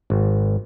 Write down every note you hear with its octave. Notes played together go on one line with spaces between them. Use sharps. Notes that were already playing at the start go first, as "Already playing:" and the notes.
G#1